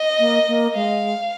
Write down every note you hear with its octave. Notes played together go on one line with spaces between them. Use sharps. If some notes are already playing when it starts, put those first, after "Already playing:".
Already playing: D#5
A#3
A#3
G#3 F5